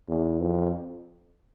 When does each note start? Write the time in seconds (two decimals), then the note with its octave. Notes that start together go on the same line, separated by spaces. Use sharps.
0.08 E2
0.40 F2